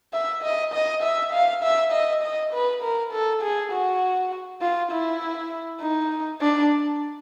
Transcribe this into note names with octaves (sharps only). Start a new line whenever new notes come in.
E5
D#5
D#5
E5
F5
E5
D#5
D#5
B4
A#4
A4
G#4
F#4
F4
E4
D#4
D4